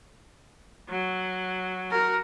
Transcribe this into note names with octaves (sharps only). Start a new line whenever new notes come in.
F#3
F#4 A#4